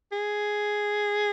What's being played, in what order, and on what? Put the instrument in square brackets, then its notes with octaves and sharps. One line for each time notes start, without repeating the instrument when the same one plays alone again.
[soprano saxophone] G#4